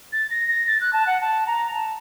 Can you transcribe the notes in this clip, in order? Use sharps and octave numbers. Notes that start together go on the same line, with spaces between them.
A6
A#6
A#6
A6
F#6
A5
F#5
A5
A#5
A5